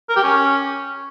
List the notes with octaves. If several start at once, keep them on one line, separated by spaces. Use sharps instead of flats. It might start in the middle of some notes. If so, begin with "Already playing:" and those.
A#4
G4
C#4